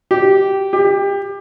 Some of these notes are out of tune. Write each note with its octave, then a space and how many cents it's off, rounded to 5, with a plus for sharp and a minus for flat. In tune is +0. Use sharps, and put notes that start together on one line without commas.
G4 -10
G4 +25